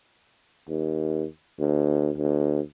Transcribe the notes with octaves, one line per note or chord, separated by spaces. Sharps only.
D#2
D2
D2